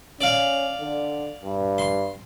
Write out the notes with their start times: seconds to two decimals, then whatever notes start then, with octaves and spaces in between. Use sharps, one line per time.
0.21 C#4 D5 F5
0.80 D3
1.43 G2
1.78 C6